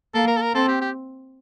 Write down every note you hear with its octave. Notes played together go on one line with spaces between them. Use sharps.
A#3 A4
A#4
A4
A#4
C4 A4
G4
G4